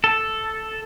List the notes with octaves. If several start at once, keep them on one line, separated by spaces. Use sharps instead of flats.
A4